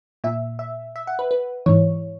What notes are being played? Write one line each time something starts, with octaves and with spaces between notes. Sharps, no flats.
A#2 E5
E5
E5
F#5
B4
B4
G#2 E3 C#5